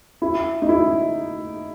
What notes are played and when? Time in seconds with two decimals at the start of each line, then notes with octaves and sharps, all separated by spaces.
0.22 E4
0.62 D#4
0.69 E4